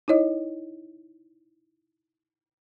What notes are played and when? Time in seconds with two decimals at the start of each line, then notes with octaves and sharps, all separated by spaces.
0.08 D#4 E4 C#5 D#5